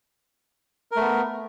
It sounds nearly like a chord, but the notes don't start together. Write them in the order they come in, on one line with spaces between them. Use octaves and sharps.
A#4 A3 B3